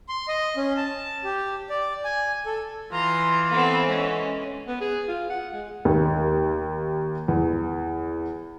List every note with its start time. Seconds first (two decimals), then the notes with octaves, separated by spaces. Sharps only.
0.09 C6
0.28 D#5
0.57 C#4
0.77 A5
1.24 G4
1.70 D5
2.04 G#5
2.46 A4
2.92 E3 F4 A#5 C6
3.51 B3 C4 A4
3.88 G#3 C#4
4.67 B3
4.81 G#4
5.09 F4
5.30 F#5
5.53 G#3
5.85 D#2
7.28 E2